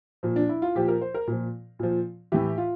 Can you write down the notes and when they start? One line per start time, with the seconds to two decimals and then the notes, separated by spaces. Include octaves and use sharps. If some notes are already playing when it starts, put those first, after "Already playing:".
0.23 A#2 F3
0.36 D4
0.49 E4
0.62 F4
0.75 A#2 F3 G4
0.88 A#4
1.01 C5
1.14 A#4
1.27 A#2 F3
1.79 A#2 F3
2.32 A2 E3 G4
2.58 F4